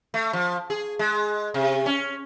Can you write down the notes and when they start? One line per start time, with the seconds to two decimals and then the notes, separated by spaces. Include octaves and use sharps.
0.14 A3
0.33 F3
0.70 G#4
0.99 G#3
1.54 C3
1.86 C#4